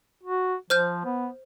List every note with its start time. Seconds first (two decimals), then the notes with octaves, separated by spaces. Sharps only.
0.23 F#4
0.70 F3 C5 F6 G6
1.05 B3